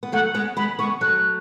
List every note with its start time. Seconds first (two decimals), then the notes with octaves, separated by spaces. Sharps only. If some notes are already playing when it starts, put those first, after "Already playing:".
0.03 B3
0.12 F#3 A3 F#5
0.34 G#3 B3
0.56 G#3 B3 B5
0.79 G#3 B3 C#6
1.01 F#3 A3 F#6